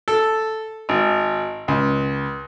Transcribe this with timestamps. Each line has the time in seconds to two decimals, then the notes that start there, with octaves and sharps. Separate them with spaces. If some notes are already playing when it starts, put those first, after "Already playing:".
0.08 A4
0.89 G#1
1.68 C#2